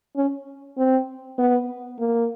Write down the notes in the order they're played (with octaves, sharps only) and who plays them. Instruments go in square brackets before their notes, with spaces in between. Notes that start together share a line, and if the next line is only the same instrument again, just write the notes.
[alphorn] C#4
C4
B3
A#3